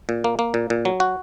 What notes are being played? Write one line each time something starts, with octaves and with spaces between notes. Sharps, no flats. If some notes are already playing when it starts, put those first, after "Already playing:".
A#2
A#3
A#3
A#2
A#2
F#3
F#4